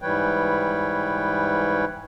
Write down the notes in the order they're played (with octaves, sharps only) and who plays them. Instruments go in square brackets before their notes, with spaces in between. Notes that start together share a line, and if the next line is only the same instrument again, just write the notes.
[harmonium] G#2 E3 G3 B4 C#5 G5